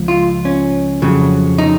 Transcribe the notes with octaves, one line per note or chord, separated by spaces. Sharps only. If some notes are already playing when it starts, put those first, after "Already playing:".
Already playing: C#2 F3
F4
C#4
F2 C#3 F#3
D#4